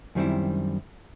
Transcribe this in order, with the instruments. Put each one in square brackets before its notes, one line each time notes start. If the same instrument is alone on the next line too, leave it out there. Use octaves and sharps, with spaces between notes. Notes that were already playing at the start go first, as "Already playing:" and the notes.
[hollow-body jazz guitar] F#2 D#3 G3 C4 E4